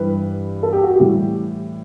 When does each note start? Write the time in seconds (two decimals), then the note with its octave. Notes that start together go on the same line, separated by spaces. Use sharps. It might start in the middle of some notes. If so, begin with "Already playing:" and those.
Already playing: G2 E3 G3 B4
0.63 A4
0.73 G4
0.83 F#4
0.94 G4
1.00 A2 E3 G3